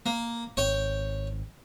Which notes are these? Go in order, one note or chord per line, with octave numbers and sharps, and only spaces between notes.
A#3
G#1 C#5 G5